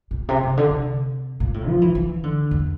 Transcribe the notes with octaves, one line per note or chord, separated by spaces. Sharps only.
A#2
C3
C3
D3
C3
A#2
A2
F3
E3
E3
D3
E2